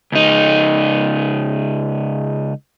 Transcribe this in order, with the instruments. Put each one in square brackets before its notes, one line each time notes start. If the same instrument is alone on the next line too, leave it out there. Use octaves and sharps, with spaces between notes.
[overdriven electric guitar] C#2 D#4